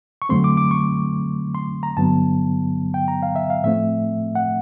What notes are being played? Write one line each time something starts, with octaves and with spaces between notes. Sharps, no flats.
C#6
F2 D3 F#3 A3 C4 C6
D6
D6
C#6
C6
A#5
G2 D3 F#3 B3 A5
G5
A#5
F5
E5
F5
A2 F3 A3 C4 E5
F#5